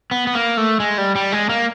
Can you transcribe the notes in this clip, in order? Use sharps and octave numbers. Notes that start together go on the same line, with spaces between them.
B3
B3
A#3
A3
G#3
G3
G3
G#3
A#3